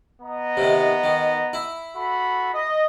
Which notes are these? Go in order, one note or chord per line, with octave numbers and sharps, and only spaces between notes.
B3 D#5 A#5
C3 D#3
D#3
E4
F#4 A4 B5
D#5